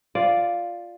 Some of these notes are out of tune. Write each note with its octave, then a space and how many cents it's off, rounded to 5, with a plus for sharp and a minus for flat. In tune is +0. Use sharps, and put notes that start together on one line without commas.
F4 +0 D5 +0